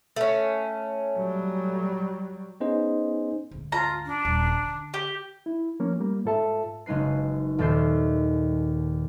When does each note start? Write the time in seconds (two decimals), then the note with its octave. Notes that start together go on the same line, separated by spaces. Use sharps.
0.16 A3 C#4
1.17 F#3 G3
2.60 B3 C#4 D#4 G#4 C5 D#5
3.51 D2 G#2
3.72 F4 A#5
4.05 D4
4.25 D#1
4.59 D3
4.94 G4
5.46 E4
5.80 F3 A#3 C#4
6.00 G3 A#3
6.25 G#2 F4 A4 E5 A5
6.86 F#1 G#3 D#4 B4 C7
7.58 D#1 D#2 A4 G6 C7